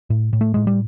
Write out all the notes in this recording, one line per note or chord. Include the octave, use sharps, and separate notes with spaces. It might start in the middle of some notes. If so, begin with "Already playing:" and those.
A2
A2
A3
A2 G#3
G3